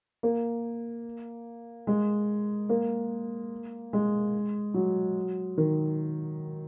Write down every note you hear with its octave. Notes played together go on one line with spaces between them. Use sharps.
A#3
G#3
A#3
G#3
F#3
D#3